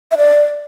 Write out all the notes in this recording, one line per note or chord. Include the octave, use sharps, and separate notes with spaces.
E5
D5